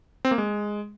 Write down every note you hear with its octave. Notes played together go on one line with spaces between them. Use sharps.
C4
A#3
G#3